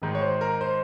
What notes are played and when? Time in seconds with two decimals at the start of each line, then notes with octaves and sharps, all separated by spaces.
0.02 G#1 G#2 D#3
0.15 C#5
0.21 C5
0.41 A#4
0.61 C5